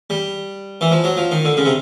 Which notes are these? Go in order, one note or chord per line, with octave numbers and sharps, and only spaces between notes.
G3
E3
F3
F#3
F3
D#3
D3
C#3
C3